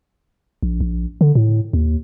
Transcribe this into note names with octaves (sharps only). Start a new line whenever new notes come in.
A#1
A#1
D3
A2
D#2